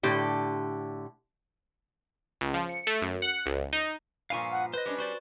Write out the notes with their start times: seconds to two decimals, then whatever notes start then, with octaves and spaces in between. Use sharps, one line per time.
0.03 A2 D3 G4
2.41 C#2
2.54 F3
2.69 C#7
2.87 A3
3.02 F#2
3.22 F#5
3.46 C#2
3.73 D#4
4.30 G2 A#2 F3 F5 G#5 C#6
4.52 F#5
4.74 B4 C5 D#5
4.86 G3 C#4 D4
4.99 F#4 C5 D5